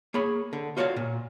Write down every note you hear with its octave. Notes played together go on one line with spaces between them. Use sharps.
A#3 G#4 C#5 B5
D3
F4 F#4 C#5 D5 F5
A#2